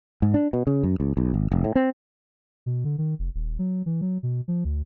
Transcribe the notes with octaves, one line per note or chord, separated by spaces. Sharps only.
G#2
D4
B2
C#3
F#2
C#2
B1
G#1
F1
A2
C4
B2
D3
D#3
F1
D#1
F#3
E3
F#3
B2
F3
D2